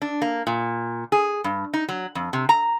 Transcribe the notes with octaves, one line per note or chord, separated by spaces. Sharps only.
D4
A#3
A#2
G#4
G2
D#4
F#3
F2
C3
A#5